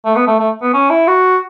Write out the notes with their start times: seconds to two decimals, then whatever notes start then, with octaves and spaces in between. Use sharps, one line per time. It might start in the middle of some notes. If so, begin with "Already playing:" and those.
0.05 A3
0.16 B3
0.27 A3
0.39 A3
0.62 B3
0.73 C#4
0.90 E4
1.07 F#4